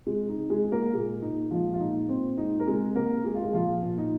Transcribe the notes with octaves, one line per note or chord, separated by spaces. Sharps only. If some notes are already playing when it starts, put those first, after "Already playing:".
C3 G#3 G#4
D#4
C3
G#3 G#4
G#3
A#3 A#4
A#2 G#3 G#4
A#2 D#4
F3 G#3 F4
F4
A#2 D#4
A#2 C4
G#3 D#4
A#4
C3 G#3 G#4
C3 A#3 A#4
G#3 G#4
F4
G#3 G#4
A#2 F3 F4
A#2
D#4